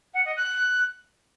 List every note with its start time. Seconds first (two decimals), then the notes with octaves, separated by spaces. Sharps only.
0.14 F#5
0.25 D#5
0.37 F#6